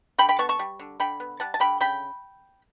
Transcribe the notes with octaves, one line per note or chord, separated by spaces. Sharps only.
D3 G5 B5
G5 B5
B3 A5 C#6
A5 C#6
G3
D3
D3 G5 B5
B3
G3 F#5 A5
A5
D3 G5 B5
C#3 G5 B5